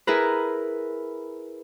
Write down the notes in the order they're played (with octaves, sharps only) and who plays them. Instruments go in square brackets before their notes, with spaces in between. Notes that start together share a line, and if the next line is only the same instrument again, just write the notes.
[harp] E4 G#4 A#4 B4